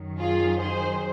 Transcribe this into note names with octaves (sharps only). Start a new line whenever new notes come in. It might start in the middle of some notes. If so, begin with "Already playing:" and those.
Already playing: F#2 D#3 F#3
F4 G#4
G#4 C5